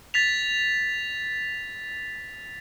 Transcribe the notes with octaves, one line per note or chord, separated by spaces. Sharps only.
A6 B6 F7